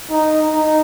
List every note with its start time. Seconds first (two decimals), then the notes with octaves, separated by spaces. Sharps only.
0.10 D#4
0.53 D#4